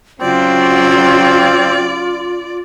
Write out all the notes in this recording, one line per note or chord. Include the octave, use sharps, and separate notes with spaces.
C#3 F#3 C4 F4 D5